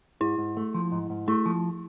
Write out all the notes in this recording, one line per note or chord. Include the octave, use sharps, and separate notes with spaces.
G#2 E4
G#2
A3
F3
G#2
G#2
A3 E4
F3